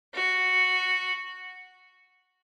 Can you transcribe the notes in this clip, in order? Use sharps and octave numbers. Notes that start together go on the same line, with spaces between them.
F#4